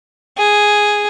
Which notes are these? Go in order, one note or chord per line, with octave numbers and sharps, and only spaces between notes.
G#4